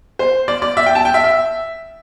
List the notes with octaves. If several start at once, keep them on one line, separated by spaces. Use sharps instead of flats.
C5
D5
D5
E5
G5
A5
G5
E5
E5